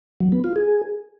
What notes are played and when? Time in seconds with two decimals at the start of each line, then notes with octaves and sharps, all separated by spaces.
0.20 F#3
0.32 B3
0.44 F4
0.56 G#4